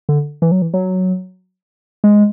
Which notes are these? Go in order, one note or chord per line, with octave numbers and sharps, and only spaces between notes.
D3
E3
F#3
E3
F#3
G#3